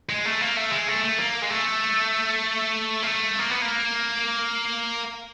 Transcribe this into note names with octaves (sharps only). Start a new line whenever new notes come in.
G#3
A3
A#3
A3
G#3
A3
A3
A#3
G#3
A3
A#3
A3
A#3
B3
A#3